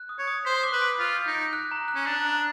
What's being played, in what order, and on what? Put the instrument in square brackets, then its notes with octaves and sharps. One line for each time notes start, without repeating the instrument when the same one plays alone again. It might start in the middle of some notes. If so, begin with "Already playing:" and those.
Already playing: [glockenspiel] F#6
D#6
[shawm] C#5
[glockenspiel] D#6
[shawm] C5 [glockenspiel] B6
[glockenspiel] D6
[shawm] B4
[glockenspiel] D7
[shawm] F4 [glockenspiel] B6
[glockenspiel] G6
[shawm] D#4
[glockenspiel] D7
F#6
A#5
F#6
[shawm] C#4
[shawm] D4 [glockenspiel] A#5
[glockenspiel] A#5